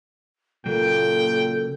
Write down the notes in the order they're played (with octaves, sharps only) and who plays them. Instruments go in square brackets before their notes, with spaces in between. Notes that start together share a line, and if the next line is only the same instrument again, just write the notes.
[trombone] A#2 [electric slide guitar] C#3 F#3 A#3 [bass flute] A4 [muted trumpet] G5